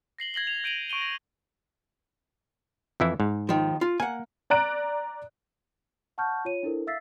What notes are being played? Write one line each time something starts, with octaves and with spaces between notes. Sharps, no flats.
A#6 C7 F#7 G7
G#6 A#6 F#7 G7
F7
G6 D7 D#7 F7 F#7
C#6 D7 D#7 G7
A#6
F2 E3 E4
G#2
D#2 D#3 F3
F4
A#3 F#5 G#5
D5 A#5 F#6 D7
F#5 A5 C#6 F6 G6
F4 C#5 D#7
D4 E4 A4 A#4 C5
E5 F5 E6 A6 B6 C7